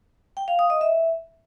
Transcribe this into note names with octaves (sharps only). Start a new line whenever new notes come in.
G5
F5
D#6
D#5
E5